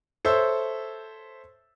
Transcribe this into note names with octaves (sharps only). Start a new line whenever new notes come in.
A4 C5 C#5 E5 E6